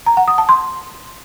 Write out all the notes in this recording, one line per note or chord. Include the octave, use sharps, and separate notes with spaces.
A#5
F#5
D#6
A5
C6